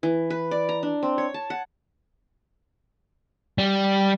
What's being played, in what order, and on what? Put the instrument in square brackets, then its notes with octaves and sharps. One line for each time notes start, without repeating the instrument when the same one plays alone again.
[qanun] E3
B4
D5
A#5
D4
C4
C#5
A5
F#5
[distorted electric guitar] G3